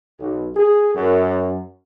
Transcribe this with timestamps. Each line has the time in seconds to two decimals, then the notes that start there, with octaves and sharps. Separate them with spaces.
0.19 B1
0.56 G#4
0.95 F#2